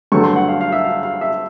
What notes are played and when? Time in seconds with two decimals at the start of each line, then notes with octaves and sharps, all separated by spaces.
0.12 G2 D3 F#3 A3 C#6
0.24 C6
0.36 F#5
0.48 F5
0.61 F5
0.72 E5
0.85 F5
1.03 F5
1.21 E5